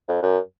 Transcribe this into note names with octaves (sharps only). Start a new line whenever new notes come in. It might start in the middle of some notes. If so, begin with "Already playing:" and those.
F2
F#2